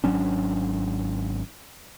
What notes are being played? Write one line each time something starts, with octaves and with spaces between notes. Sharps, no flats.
G#1 F#3 C#4 D4